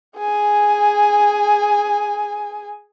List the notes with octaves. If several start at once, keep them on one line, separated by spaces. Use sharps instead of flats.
G#4 G#5